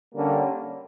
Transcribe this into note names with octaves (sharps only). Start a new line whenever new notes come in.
D3 G3 A#3 C#4